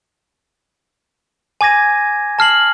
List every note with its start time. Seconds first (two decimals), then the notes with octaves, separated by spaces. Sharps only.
1.61 G#5 D6 G#6 A#6 D#7
2.39 A5 F6 C7 F#7